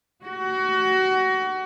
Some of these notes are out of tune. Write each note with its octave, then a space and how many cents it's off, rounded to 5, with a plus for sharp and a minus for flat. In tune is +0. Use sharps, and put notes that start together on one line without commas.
F#4 +25